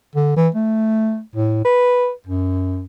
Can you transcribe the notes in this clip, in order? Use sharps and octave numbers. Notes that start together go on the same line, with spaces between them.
D3
E3
A3
A2
B4
F#2